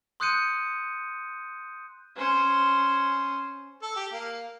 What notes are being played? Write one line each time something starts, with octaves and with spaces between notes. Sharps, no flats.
C6 D#6 F#6 G6 C#7 D#7
C#4 C5
A4
G4
A#3